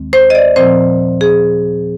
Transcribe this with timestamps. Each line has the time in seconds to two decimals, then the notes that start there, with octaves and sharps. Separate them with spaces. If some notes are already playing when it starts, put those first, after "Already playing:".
Already playing: D#2 D#3 G#3 C4
0.13 C5
0.30 D#5
0.35 D5
0.56 A#2 F3 C4 C5
1.21 G#4